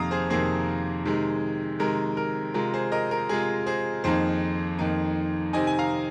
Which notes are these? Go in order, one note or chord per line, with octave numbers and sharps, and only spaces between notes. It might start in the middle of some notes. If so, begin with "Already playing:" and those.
Already playing: F2 C3 D#3 A#3 F5 A#5 D#6
G#4 C5
F2 C3 D#3 A#3 G#4 C5
C3 D#3 G#3
C3 D#3 G#3 A#4
A#4
C3 G#3 F4 A#4
G#4 C5
A#4 D#5
A#4
C3 G#3 F4 G#4
G#4 C5
F2 D#3 A#3 D#4 G#4 C5
F2 D#3 A#3 D#4
C3 D#3 C4 D#4 D#5 G#5
G#5
F5 A#5